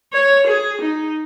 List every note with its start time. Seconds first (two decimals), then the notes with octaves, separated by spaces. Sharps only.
0.13 C#5
0.47 G#4
0.82 D#4